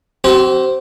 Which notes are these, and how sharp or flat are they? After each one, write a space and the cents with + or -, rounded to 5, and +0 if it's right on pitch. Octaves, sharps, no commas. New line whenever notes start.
C4 +0 F#4 +45